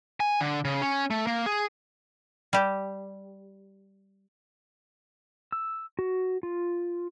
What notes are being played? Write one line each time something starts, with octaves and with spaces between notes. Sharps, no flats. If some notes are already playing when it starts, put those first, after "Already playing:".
G#5
D3
C#3
C#4
A3
A#3
G#4
G3 G4
E6
F#4
F4